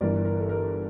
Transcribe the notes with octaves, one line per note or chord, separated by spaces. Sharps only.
G1 G2 E3 A#4 D5
A#4
A4
A#4